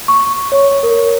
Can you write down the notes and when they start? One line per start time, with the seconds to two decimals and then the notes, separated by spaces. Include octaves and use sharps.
0.08 C#6
0.52 C#5
0.83 A#4